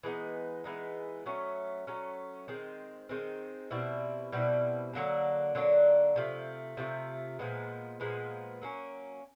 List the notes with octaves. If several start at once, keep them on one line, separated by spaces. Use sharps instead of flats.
E3 G#3 B3 D#4
E3 G#3 B3 D#4
F#3 A3 C#4
F#3 A3 C#4
D#3 G#3 C4
D#3 G#3 C4
B2 G3 C4 E4
B2 G3 C4 E4
D3 F#3 A#3 D4
D3 F#3 A#3 D4
C3 F3 A3
C3 F3 A3
A#2 F3 G#3 B3
A#2 F3 G#3 B3
F#3 A#3 C#4